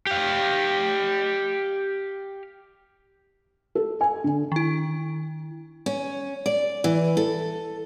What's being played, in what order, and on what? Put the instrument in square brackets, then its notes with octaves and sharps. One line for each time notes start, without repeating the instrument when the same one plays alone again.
[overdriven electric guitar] G4 F5
[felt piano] A4
G#5
D3
[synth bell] D#3 E4
[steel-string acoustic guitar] C#4
D5
E3
A4